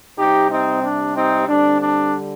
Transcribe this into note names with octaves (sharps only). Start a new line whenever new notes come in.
C3 G3 C4 D#4 G4
C4 D#4
D4
C4 D#4
D3 G3 C4 D4
D4